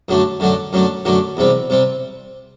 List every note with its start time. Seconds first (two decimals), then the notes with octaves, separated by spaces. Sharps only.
0.08 F#2 D3 F#3 A3 D4
0.40 F#2 D3 F#3 A3 D4
0.73 F#2 D3 F#3 A3 D4
1.05 F#2 D3 F#3 A3 D4
1.37 E2 C3 G3 C4
1.70 C3 G3 C4